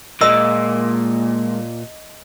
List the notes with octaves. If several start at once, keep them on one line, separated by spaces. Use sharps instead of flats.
A#2 G#3 A#4 D#5 E6